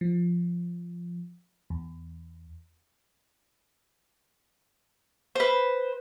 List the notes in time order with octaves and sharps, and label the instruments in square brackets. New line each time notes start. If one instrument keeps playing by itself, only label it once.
[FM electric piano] F3
E2
[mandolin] B4 C5